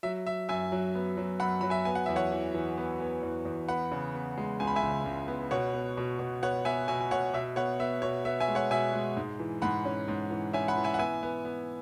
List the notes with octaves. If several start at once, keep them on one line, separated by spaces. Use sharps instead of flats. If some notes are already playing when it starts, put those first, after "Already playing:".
F#3 E5
F#3 E5
F#2 E5 G#5
F#3
B3
F#3
F#2 F#5 B5
F#3 B5
E5 G#5
B3 G#5
F#5
E2 E5
C#5 F#5
E3
E3
B3
B3
E2
E2
B3 F#5 B5
C#3
B3
G#3
C#2 G#5
B5
E5 G#5
C#2
C#2
B3
B2 C#5 F#5
B3
B2
B2
B3 C#5 F#5
B3 E5 G#5
B2 E5 G#5
G#5
B2 C#5 F#5
B2 E5
B3 C#5 F#5
B3 E5
B2 C#5
B3 E5
E5 G#5
G#3
C#5 F#5
B2 E5 G#5
G#3
G#2
E3
G#2 F#5 B5
C#4
G#2
E3
C#4 E5 G#5
F#5 B5
E3
E5 G#5
F#5
B3 E5 G#5
B3
B3